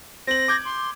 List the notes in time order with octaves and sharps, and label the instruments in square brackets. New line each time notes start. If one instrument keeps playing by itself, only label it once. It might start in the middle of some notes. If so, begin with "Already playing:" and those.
[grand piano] C4 F#7 [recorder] A#6
[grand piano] D6 G6 G#6
[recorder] C6